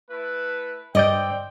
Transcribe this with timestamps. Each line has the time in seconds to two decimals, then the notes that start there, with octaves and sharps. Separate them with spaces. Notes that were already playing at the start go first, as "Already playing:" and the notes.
0.10 A3 E4 B4
0.95 G2 C4 D5 D#5 G5 G6